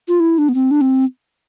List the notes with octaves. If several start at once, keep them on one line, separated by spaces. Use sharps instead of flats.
F4
E4
D4
B3
C4
D4
C4